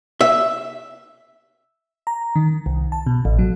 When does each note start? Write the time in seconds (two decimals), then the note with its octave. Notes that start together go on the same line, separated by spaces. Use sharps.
0.21 E5
2.07 A#5
2.36 D#3
2.66 C2
2.92 A5
3.06 B2
3.25 A1
3.39 F#3